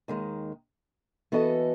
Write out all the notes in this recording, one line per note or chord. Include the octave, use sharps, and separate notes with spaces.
D#2 D#3 G#3
E3 B3 F#4 A4 D#5